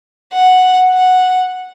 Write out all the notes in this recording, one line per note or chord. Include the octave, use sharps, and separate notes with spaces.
F#5
F#5